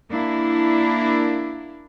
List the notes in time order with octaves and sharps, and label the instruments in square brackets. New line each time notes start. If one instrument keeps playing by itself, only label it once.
[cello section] A#3 D4 E4